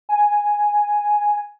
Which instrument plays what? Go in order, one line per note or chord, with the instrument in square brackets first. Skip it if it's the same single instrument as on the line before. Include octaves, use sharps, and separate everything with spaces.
[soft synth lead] G#5